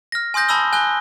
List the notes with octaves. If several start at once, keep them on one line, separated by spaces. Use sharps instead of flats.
F6 A#6
G#5 C6 D#6 G6 A#6
G#5 A5 B5 D#6 E6 G7
G#5 F#6 G7